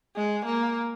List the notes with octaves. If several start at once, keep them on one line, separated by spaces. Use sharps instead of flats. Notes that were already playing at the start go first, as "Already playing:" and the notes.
G#3
A#3